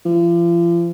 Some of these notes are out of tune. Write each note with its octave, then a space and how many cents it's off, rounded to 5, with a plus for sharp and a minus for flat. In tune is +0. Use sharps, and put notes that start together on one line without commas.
F3 -40